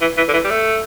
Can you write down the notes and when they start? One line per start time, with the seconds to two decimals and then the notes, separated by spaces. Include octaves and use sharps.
0.01 E3
0.17 E3
0.28 D3
0.33 E3
0.44 G3
0.50 A3